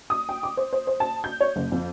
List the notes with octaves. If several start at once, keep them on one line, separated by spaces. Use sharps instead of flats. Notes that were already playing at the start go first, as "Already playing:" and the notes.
D#6
G5
D6
C5
C5
C5
A5
G6
C#5
F#1
F2